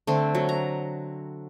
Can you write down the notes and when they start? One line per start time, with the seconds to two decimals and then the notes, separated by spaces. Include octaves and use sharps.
0.07 D3 A3 C4
0.35 F#3
0.49 A#5